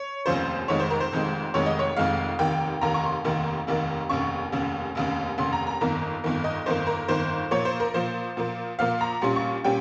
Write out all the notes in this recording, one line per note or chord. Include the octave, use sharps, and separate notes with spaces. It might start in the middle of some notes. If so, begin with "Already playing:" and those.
Already playing: C#5
F1 D#2 C#3 F3 C5
F1 F2 D#3 G#3 C#5
C5
A#4
C5
F1 F2 D#3 G#3
F1 F2 D#3 G#3 C#5
D#5
C#5
F1 F2 D#3 G#3 F5
F1 D#2 D#3 A#3 G5
F1 D#2 D#3 A#3 A#5
C#6
C6
F1 D#2 D#3 A#3
F1 D#2 D#3 A#3
F1 D#2 C#3 C#6
F1 D#2 C#3
F1 D#2 C#3
F1 D#2 C#3 C6
A#5
A#5
G1 F2 D#3 A#3
G1 F2 D#3 A#3
D#5
G1 F2 D#3 A#3 C5
A#4
G1 F2 D#3 A#3 C5
A#2 F3 A#3 C#5
C5
A#4
A#2 F3 A#3 C5
A#2 F3 A#3
A#2 F3 A#3 F5
A#5
A#1 A#2 G3 C#4 F4 C6
C#6
A#2 G3 C#4 G5